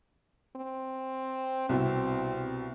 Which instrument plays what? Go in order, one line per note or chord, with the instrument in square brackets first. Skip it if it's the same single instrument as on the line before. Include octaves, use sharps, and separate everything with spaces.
[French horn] C4
[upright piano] C2 B2 E4 [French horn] C4